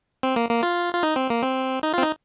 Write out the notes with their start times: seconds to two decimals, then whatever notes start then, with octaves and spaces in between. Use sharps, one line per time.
0.23 C4
0.36 A#3
0.50 A#3
0.63 F4
0.94 F4
1.03 D#4
1.16 C4
1.30 A#3
1.43 C4
1.83 D#4
1.94 F4
1.98 C4
2.03 D#4